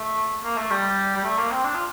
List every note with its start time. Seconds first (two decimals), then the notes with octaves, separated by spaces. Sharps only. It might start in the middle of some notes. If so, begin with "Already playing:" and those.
Already playing: A3
0.44 A#3
0.57 A3
0.71 G3
1.16 G3
1.24 A3
1.38 A#3
1.51 C4
1.65 D4
1.75 F4